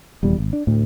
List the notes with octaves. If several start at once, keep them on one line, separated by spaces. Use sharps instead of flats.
D#1 E2 G3
G#1
D4
D2 A2